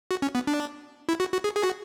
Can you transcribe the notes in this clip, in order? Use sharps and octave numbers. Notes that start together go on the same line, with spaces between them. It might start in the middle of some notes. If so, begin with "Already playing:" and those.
F#4
C#4
B3
D4
E4
F#4
F#4
G#4
G#4
F#4